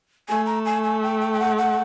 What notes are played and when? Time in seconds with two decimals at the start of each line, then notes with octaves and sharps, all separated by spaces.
0.29 A3 G#5
0.46 A#5
0.65 G#5
0.84 G#5
1.03 G5
1.21 G5
1.34 G5
1.40 F#5
1.58 F#5